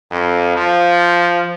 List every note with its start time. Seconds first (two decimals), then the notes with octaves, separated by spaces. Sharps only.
0.11 F2
0.57 F3